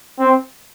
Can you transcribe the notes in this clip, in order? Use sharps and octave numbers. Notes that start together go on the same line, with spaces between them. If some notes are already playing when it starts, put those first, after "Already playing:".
C4